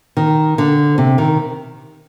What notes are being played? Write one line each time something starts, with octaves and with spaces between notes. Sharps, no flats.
D#3
D3
C3
D#3